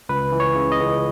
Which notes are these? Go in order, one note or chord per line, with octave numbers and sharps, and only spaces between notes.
C#2 B4
E3
C#5
C#3
D#5
C#2